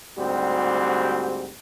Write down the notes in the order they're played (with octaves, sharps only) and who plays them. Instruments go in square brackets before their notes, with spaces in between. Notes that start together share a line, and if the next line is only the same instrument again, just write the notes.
[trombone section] D2 G#2 G3 C4 F#4 G4